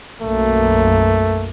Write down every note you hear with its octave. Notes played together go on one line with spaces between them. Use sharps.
B1 F#2 A3 A#3